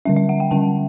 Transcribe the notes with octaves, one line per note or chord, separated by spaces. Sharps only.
D3 G3 C#4 E5
E5
F#5
G5
D3 G3 C#4 A5